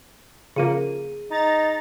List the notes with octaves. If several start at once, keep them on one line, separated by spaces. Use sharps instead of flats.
C#3 F3 A#3 G#4 D#7
D#4 A#5 A6